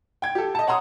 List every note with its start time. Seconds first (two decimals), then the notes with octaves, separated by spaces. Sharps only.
0.22 G5 G#6
0.35 G4 A4
0.55 D#5 A5
0.67 C#5 F#5 A#5 C6 D#6